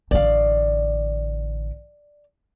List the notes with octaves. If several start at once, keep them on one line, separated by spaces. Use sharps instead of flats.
A1 D3 D5 F5